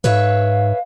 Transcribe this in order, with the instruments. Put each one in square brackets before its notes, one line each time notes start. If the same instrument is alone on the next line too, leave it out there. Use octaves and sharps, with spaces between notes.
[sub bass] G#2 [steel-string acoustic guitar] B4 C#5 E5 [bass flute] F5